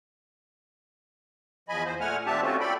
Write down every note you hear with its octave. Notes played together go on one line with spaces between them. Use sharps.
E2 F3 D#5 G#5 B5
E2 C5
A#2 A3 F#5 G#5 F6
D#2 C4 D4 G4 E5 A5
A3 C4 C#4 F4 F#4
A4 D5 G5 B5